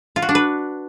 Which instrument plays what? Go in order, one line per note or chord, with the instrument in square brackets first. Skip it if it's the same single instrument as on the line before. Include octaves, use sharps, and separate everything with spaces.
[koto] F4
F#4
D4
B4